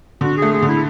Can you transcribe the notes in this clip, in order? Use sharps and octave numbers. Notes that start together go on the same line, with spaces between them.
D3 F#4
A3 G#4
G#4
D3
E4